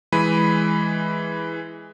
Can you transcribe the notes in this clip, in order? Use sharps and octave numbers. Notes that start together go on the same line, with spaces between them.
E3 G#3 B5 D#7